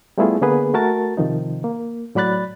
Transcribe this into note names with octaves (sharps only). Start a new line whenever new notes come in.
G3 A3 B3 E4 F4 G#4
D3 A#3 B3 G#4 B4
A3 F#4 A#4 A5 A6
C3 D#3 F3 D#4
A#3
A2 F#3 D5 B5 F#6 A6